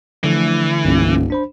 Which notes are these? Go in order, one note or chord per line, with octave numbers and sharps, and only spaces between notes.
D3 E3 F3 A3
D#1 C2 G2 C#4
D4 C5 B5